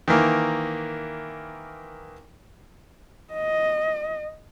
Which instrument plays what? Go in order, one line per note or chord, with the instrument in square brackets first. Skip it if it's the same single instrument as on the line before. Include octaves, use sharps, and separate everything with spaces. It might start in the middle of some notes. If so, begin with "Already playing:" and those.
[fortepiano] D#3 E3 A#3
[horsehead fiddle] D#5